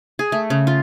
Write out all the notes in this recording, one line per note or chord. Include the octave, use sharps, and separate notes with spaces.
G#4
A3
C#3
F4